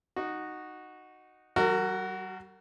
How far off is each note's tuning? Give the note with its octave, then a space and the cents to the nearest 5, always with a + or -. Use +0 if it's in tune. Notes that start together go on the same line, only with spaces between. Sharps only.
D#4 -10 F#4 +0
G3 -45 F#4 +10 A#4 -30